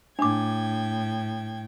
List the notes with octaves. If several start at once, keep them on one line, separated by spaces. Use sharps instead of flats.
A2 D4 G5 D6 G#6